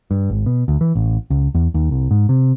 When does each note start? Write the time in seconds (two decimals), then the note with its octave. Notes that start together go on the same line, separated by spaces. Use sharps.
0.11 G2
0.30 G#1
0.46 B2
0.68 D2
0.81 E3
0.95 A1
1.30 C#2
1.55 E2
1.74 D#2
1.91 C2
2.11 G#2
2.29 C3